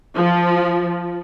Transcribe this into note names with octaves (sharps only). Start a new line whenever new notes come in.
F3